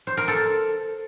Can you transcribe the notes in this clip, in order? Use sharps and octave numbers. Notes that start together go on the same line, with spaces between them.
C5
A#4
A4